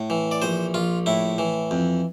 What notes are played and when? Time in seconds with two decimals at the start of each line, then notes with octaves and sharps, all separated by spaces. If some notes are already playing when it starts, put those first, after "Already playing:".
Already playing: A2
0.10 E3
0.31 D5
0.42 A#1 C5
0.74 A#1 F4
1.06 A2 E4
1.38 E3
1.71 F2